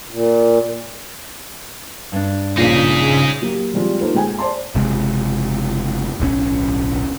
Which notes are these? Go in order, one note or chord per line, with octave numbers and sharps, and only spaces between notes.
A#2
G2 D4
A#1 A#2 C#3 D#4 G#4 B6
F#3 A#3 G4
F3 G3 G#3 C4 F4
A#3 D#4 F4 A4 B4 C5
G#3 G5 G#5
C5 D5 A5 C6
F#1 C3 G#3
D1 B1 C4 C#4